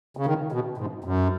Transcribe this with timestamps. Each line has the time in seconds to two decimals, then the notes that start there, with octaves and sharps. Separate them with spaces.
0.17 C#3
0.26 D#3
0.52 B2
0.78 G#2
1.04 F#2